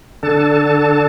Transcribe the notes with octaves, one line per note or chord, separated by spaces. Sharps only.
D3 D4 A4 A5